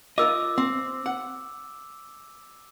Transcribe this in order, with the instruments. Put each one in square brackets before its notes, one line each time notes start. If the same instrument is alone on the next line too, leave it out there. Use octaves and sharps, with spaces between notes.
[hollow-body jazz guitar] F4 A#4 D#5 [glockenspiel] D6 E6
[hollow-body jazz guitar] C4
F#5